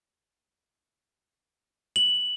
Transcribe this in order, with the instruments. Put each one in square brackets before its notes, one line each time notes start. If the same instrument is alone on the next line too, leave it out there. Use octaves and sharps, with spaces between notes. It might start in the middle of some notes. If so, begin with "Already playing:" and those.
[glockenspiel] F#7